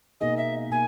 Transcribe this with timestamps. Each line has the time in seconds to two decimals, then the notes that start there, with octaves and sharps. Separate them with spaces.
0.20 B2 A#3 D#4 G#4 D#5
0.37 E5
0.70 B2 A#3 G#5